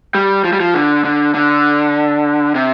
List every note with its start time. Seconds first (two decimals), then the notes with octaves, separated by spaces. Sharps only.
0.15 G3
0.44 F3
0.53 G3
0.60 F3
0.75 D3
1.05 D3
1.34 D3
2.55 C3